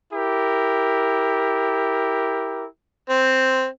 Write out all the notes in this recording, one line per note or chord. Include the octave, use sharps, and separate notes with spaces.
E4 G4 A#4
C4